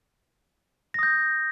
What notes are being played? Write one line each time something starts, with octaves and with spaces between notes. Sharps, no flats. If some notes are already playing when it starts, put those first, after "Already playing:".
D#6 G6 A#6